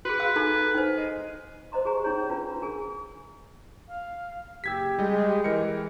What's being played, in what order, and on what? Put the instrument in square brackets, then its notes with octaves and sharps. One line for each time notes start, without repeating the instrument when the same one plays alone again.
[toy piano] F#4 G#4 [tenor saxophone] B4
[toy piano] F5 E6
D#4 A4 A#5
D#4 C5
[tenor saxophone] G#3
[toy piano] C5 D#5 A#5 C6
G4 G#4 G#5 A#5
C#4 D#4 C#5
D4 F4 F#4 B4 A#5
D4 G#4 A#4 G#5
[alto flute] F5
[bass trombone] F#1 [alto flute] G4 [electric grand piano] E6 G#6 B6
[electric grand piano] G3 D#5 [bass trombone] G#3
[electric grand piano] E3 A#4 C#7 [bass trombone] G#3